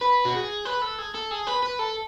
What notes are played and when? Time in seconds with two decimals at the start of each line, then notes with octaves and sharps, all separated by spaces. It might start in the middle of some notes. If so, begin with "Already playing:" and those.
0.01 B4
0.25 F#4
0.34 G#4
0.65 B4
0.82 A4
0.98 G#4
1.14 A4
1.31 G#4
1.47 B4
1.63 B4
1.79 A4